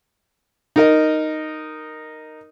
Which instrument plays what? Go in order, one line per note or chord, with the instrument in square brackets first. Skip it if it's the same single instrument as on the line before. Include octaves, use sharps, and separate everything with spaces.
[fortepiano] D#4 A#4 D#5